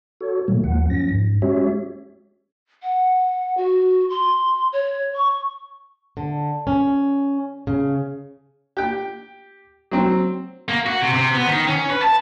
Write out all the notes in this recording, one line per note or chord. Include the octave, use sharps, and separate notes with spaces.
F#4 A4 C#5
A#2 D#3 F#3 G3 A3 A#3
D#2 F3 A#3 F#5
F#2 F3 C#4 A#6
G#2
G#3 C#4 F#4 G4 C#5 E5
F#5
F#4
C6
C#5
C#6
D3
C#4
C#3
G4 G5
F#3 C4
A#3
F#4
C3
C3
B3
D#3
C#4
B4
A5